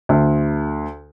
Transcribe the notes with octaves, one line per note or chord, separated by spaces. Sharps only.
D2